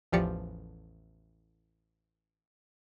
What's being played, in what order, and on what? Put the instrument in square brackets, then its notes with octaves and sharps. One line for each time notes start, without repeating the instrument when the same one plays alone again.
[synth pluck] A1 E2 F3 G4 D5 C#7